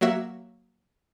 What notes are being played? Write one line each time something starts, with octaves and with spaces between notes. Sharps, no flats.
F#3 A#3 F#4 E5